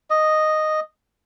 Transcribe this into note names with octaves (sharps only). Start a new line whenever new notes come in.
D#5